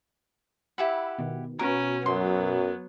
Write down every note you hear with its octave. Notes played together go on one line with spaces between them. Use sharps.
E4 G4 F#5 B5 E6
B2 D#3
B2 C#4 F#4 A#4 B4
F#2 F#3 B3 C6